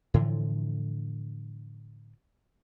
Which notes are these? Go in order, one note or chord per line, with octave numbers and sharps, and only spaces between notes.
A2 D3 E3 F3